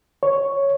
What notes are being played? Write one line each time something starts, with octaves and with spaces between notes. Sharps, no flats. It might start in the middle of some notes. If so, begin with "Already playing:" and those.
C#5